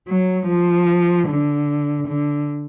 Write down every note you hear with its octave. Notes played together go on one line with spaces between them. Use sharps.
F#3
F3
D3
D3